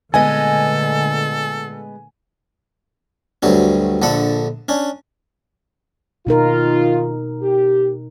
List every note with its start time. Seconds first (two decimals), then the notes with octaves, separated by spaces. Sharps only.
0.14 A#2 D3 G#3 A3 B3 A4 D#5 G#5
3.43 D2 G2 F#3 C4
4.02 A#1 D3 A4 F#5
4.69 C#4 D4
6.27 B2 D#3 D#4 F4 A#4
7.42 G4